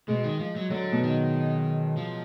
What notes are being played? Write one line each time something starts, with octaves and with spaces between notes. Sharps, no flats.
B2 G#3
D#3
F3
F#3
D3 F#3
B2
D#3
F3